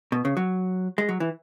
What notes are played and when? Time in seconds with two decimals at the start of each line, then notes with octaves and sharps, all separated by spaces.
0.12 B2
0.25 C#3
0.37 F#3
0.98 G#3
1.09 F#3
1.20 E3